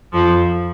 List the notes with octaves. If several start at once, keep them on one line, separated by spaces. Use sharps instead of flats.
F2 F3